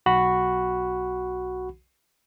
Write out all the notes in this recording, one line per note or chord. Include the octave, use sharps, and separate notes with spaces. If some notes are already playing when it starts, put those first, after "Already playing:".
B1 F#4 B5